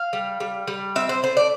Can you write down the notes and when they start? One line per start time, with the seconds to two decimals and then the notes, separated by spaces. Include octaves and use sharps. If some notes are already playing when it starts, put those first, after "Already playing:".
Already playing: F5
0.13 G3
0.40 G3
0.67 G3
0.95 C4 E5
1.09 C5
1.23 A3 C5
1.37 D5